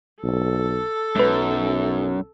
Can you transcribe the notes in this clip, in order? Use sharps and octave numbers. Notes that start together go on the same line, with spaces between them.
B1 A4
B1 F#2 G#3 B4